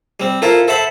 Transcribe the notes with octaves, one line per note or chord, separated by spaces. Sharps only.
G3 C4
E4 F4 A4 A#4 C5
A4 C5 E5 F#5 A5 B5